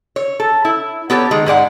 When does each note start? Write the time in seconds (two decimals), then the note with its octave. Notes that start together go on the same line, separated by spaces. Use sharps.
0.16 C#5
0.40 A4
0.65 E4
1.10 B3 G4 A4 C#5
1.31 D#3 G#3
1.46 G#2 G#3 D5 F#5